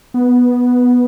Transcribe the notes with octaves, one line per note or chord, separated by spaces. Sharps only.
B3